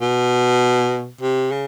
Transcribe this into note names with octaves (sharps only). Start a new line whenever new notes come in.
B2
C3
C#3